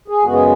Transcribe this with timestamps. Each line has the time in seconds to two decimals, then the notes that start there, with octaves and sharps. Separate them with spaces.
0.08 G#4
0.22 F#2 C#3 G#3 B3 F#4
0.33 G#4